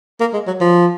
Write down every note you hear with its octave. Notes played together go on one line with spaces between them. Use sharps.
A#3
G#3
F#3
F3